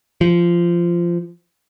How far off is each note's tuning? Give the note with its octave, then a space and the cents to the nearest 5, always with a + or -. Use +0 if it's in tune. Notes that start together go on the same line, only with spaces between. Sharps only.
F3 -15